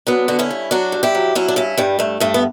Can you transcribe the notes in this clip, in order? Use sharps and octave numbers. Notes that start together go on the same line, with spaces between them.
F#3 B3 D4
D3 F#4
C#4 E4
G2
F#3 D4 F#4
G2
E4 G4
F#3
F#3 C#4 E4
D4
G2 C#4 E4
G2 G3
G2 A3
G2 A3
B3